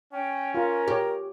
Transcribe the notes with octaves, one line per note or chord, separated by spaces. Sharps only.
C#4 G5
F4 A#4
G4 C#5